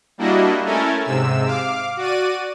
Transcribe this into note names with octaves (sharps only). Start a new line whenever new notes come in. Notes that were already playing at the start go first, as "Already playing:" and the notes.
G3 A#3 D4 E4 F#4 D#5
A3 C#4 E4 A4 A#4 G#5
G#2 C3 E6
F5 D6
F#4 D5 D#7